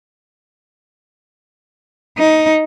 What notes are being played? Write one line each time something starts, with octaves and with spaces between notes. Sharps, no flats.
D#4